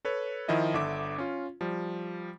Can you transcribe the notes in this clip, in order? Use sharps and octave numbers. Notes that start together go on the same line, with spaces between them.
A4 B4 C#5
D#3 F3 E4 D#5 E5
G1 D3 E5 D6
C#4 F4
F3 G3